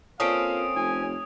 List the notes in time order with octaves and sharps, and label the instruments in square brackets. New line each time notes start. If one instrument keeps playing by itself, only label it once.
[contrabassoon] A#2 [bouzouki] C4 C#4 A4 [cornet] F5 [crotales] D#6 D7
[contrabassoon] F1 [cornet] G#5